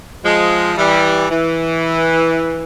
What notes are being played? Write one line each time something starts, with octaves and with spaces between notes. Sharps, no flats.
F3 G#3
E3 G3
E3